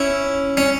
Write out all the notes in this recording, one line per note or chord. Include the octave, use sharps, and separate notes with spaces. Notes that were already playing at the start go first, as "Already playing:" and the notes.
Already playing: C#4 E4
C#4